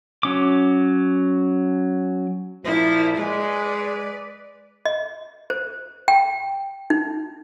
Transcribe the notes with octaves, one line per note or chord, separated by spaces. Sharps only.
F#3 C#4 D6
A#2 F3 E4
G#3 B4 D5
D#5
C5
G5
D#4